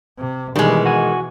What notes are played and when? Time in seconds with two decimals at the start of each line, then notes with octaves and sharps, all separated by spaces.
0.19 C3
0.56 B2 D#3 E3 G3 G#3
0.85 F#4 G#5